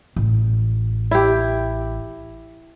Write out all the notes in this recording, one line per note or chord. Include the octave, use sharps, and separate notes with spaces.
A1
E4 G4